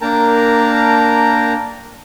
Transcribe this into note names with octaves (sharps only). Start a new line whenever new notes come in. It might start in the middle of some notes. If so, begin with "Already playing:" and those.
A#3 D4 A#4 G5 A5 A#5